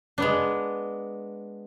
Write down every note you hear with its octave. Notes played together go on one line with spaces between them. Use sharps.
G#3 B3 D4